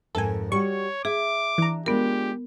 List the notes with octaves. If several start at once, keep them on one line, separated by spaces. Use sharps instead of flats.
F2 G#2 A4 A#4 G#5
G3 F#4 C#5 C#6
G#4 E5 D6
E3 D4 A#5
G#3 B3 D4 F4 G4 A#4